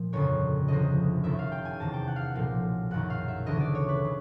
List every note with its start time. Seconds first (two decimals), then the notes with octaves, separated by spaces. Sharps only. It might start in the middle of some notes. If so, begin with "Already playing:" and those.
Already playing: A#2 F3
0.13 G1 F2 C#3 C#5
0.68 D2 C3 F3 D#5
1.24 F#1 F#2 D#3 E5
1.39 F5
1.52 G5
1.65 G#5
1.80 E2 C3 D#3 A5
1.94 G5
2.08 F#5
2.16 F5
2.21 F#5
2.35 B1 A#2 F3 F5
2.91 F#1 F#2 D#3 F#5
3.10 F5
3.28 E5
3.46 D2 C#3 E3 D#5
3.60 D5
3.75 C#5
3.89 B4
4.04 C#3